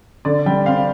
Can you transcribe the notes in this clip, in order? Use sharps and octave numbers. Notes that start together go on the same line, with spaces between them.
D3 D5
G3 G5
C4 F5